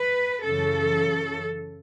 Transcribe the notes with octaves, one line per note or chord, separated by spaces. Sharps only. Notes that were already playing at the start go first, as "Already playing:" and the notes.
Already playing: B4
F#2 C#3 E3 A4